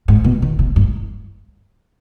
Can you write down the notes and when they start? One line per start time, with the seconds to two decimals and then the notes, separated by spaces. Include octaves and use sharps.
0.08 G#2
0.24 B2
0.42 D#3
0.59 B2
0.76 G2